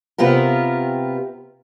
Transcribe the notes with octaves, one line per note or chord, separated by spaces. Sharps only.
C3 B3 F4 G4 A#4